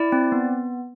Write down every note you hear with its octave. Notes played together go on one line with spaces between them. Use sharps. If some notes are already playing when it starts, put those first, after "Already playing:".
Already playing: E4 D5
C4
B3